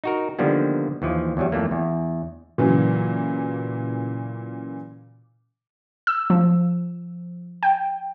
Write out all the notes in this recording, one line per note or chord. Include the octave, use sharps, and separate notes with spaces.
D#4 F#4 A#4
D3 D#3 F3 G3 A#3 B3
D#2 E3 F3
E2 F#3 G3
F2 E3 A3 A#3
E2
A#2 C#3 E3 F#3
E6
F3
G5